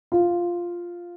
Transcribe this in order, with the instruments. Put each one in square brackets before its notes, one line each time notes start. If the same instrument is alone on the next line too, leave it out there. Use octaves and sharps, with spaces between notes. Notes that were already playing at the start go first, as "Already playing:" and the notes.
[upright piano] F4